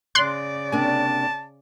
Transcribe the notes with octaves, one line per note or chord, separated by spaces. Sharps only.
C#3 D5 C6 F#6
C3 A#3 D4 A5